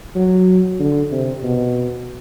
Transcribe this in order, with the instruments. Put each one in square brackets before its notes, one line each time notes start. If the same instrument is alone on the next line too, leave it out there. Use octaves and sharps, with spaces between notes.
[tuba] F#3
D3
C3
B2